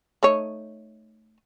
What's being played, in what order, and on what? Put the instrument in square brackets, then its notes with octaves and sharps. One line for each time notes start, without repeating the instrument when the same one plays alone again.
[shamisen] A3 D#4 C#5